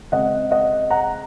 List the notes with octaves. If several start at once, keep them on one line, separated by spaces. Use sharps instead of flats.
C#3 G#3 C4 D#5 F#5
D#5 F#5
F#5 A#5